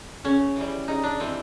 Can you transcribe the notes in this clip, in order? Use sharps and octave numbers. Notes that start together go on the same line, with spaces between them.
C#3 C#4
E3 G3
C#3 D#4
D4
E3 G3 C4